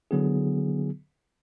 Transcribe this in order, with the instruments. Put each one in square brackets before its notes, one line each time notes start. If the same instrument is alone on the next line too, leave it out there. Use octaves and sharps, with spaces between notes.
[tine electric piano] D3 F#3 B3 E4 G#4